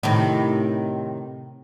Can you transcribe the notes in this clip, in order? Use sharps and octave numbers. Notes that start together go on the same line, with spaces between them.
A2 C3 D#3